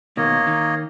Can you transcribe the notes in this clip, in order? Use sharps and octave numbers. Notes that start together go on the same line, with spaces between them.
B2 D#3 A#3 C#5 D#5
D#3